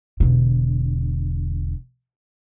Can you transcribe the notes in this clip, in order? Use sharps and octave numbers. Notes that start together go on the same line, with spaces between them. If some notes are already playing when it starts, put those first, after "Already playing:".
E1 D3